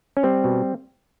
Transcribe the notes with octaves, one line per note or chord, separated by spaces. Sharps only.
C#4
G3 C4
B2